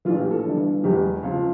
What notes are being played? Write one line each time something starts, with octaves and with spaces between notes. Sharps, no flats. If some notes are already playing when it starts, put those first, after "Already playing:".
A#1 A2 E3 F4
G4
A4
G1 G2 E3
E1 E2 E3 G4
C#2 C#3 F3